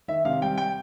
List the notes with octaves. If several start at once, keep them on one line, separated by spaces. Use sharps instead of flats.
D#3 E5
C3 F5
G3 G5
G5